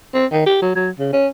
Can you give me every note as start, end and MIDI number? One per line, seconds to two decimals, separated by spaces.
0.14 0.26 60
0.32 0.42 51
0.46 0.58 67
0.62 0.73 54
0.76 0.91 54
0.99 1.10 49
1.13 1.28 61